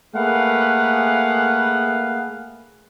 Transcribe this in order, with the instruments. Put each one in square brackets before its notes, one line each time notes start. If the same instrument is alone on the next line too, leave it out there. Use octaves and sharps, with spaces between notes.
[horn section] A3 A#3 G#4 B4 F5 F#5